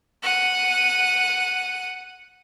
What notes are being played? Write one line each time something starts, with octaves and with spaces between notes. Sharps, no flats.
F#5 D#7